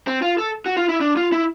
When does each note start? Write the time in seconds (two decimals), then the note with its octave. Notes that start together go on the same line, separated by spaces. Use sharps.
0.07 C4
0.22 F4
0.38 A4
0.66 F#4
0.77 F4
0.89 E4
1.01 D4
1.17 F4
1.32 E4